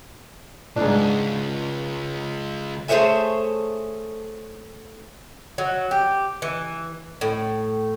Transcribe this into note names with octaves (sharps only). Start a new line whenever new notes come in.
C#2 G#2 D4
A3 G#4 C5 C#5 E5 G#5
F#3
G4
E3
A2